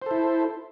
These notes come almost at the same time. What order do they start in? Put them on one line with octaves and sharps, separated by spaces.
C5 A4 E4